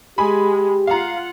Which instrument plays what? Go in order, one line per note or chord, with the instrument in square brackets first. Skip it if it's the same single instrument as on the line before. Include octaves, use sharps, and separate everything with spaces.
[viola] G#3 [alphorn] G4 [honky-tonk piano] G#5 B5
[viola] F4 F#5 [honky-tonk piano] F5 A#5